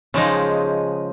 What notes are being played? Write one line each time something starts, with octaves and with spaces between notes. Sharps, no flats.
C#3 F3 G#3 D#4